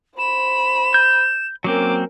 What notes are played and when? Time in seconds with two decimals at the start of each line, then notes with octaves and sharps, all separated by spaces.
0.19 C5 B5 E7
0.94 G6
1.64 F#3 A#3 C4 C#4 A#4 D6